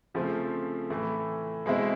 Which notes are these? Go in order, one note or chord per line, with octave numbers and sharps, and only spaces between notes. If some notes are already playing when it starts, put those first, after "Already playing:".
C#3 F3 A3 C4
A2 E3 A3
B2 G#3 C4 E4